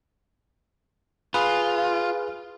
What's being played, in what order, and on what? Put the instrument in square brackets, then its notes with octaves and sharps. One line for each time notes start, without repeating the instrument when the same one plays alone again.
[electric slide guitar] F4 [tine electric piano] G#4 B4